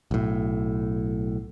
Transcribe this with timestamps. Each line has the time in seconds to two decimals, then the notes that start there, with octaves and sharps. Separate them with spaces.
0.11 B1 A2